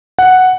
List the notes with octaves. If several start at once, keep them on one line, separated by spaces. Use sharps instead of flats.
F#5